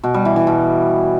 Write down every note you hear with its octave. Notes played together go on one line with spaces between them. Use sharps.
B2
G3
E3
E3
B2